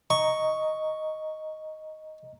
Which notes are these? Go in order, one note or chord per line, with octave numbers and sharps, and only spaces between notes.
D#5 A#5 C#6